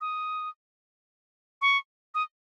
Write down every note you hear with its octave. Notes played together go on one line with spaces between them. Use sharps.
D#6
C#6
D#6